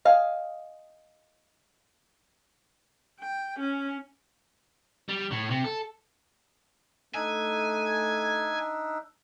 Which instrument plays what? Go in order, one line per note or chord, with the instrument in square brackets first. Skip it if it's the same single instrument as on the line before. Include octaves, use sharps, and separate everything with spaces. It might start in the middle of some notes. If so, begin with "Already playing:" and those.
[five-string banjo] D#5 F5 G#5
[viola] G5
C#4
[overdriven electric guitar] G3
A2
C3
A4
[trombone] A3 [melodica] D4 D#4 E5 [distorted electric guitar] G#5